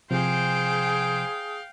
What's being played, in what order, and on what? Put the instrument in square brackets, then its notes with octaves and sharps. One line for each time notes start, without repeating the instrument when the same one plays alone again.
[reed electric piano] C3 F3 [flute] G#4 [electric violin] C5 D7 [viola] F5 G5